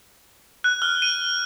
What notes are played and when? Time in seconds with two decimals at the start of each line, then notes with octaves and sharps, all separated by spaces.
0.64 F#6
0.82 F6
1.02 D#7